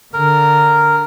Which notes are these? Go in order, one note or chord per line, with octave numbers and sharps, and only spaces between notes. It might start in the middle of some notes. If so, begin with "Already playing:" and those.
D3 A#4